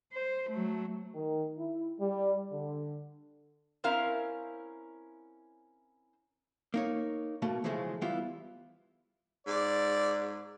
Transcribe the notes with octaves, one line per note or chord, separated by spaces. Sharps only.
C5
F#3 A3
D#3
E4
G3
D3
C4 C#4 E4 A#4 F5
A#3 D#4 C#5
B2 A3 A#3
C#3 E3 F3 G#3 A3
E3 G3 B3 E4 F4 G4
G#2 D5